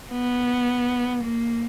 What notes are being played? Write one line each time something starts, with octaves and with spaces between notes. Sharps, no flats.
B3
A#3